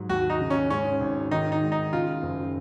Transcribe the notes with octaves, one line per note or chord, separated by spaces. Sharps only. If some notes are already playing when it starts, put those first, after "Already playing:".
Already playing: G#2 F#3
D#2 F#4
D#4
C#3
C#4
G#2 C#4
G#1
D#3 D#4
D#4
G#2
D#4
C#3 F4
F#1